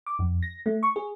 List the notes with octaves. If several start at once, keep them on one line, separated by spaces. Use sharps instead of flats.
D6
F2
A#6
A3
C#6
G#4